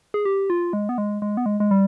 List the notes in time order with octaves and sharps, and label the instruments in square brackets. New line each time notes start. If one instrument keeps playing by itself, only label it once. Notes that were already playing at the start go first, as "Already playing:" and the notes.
[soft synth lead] G#4
G4
F4
G#3
B3
G#3
G#3
B3
G#3
G#3
G3